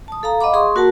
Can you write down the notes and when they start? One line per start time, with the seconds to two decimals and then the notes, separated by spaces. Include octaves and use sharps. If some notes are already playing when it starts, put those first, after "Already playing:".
0.08 A5 D#6
0.23 A4 F5 A#5
0.41 D#5 F5 F#5 B5 D6
0.53 G#4 C6 C#6 D#6
0.75 A#3 F#4 A#4 F#5 A5